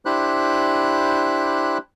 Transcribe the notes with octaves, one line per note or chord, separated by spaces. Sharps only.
D4 E4 G4 C5 B5 F#6